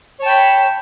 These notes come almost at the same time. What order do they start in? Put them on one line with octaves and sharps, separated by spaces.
C#5 A5 G5 B5